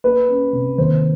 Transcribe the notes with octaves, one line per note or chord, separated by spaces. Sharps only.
A#3 B4
C#4
C3
D#2 C5